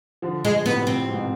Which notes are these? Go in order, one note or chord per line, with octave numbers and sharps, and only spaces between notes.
D3 F3
G#3
A2 C3 B3
C4
G#2 B2